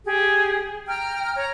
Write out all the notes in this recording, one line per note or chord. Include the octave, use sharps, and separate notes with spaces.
G4 G#4
G5 A#5 F6
C#5 A#5